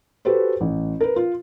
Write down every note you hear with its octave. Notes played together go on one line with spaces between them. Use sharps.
F#4 G4 A4 B4 C5
A1
A#4 B4
F4